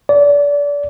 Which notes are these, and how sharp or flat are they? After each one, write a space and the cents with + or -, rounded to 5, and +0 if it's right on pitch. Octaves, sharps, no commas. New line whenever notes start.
D5 -30